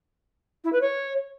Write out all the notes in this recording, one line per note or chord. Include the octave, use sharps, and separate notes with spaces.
E4
B4
C#5